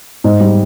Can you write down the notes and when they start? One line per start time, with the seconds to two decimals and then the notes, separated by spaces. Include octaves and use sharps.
0.24 G#2
0.40 G3